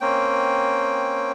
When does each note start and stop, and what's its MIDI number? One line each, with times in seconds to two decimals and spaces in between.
0.01 1.32 58
0.01 1.32 60
0.01 1.32 61
0.01 1.32 79